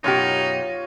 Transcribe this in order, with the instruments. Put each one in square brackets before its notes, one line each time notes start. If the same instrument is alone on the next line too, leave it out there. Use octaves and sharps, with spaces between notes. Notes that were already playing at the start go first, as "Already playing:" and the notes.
[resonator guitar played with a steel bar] F#2 B2 G4 [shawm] D#4 [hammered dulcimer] F4 C#5